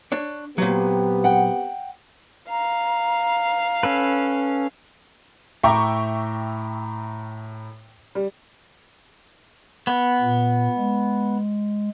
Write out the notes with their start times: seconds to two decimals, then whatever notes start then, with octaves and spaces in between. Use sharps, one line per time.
0.12 D4 C#5
0.58 A#2 F#3 B3 C4 G4
1.24 F#5 G5
2.50 F5 A#5
3.83 C#4 A4 B4
5.63 A2 E5 G5 A#5 C#6 D6
8.15 G3
9.87 B3
10.21 A#2
10.77 G#3